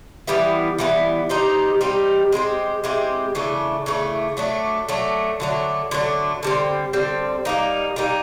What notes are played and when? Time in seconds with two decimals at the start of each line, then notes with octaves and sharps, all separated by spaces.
0.27 E3 G3 B3 E4
0.78 E3 G3 B3 E4
1.29 G3 C4 D#4 G4
1.81 G3 C4 D#4 G4
2.32 G#3 C4 E4 G4
2.84 G#3 C4 E4 G4
3.35 C#3 E3 A3 D4
3.86 C#3 E3 A3 D4
4.37 F#3 A3 D4
4.89 F#3 A3 D4
5.40 D3 F#3 A3 D4
5.91 D3 F#3 A3 D4
6.43 D3 G3 C4
6.93 D3 G3 C4
7.45 G3 A#3 D#4
7.96 G3 A#3 D#4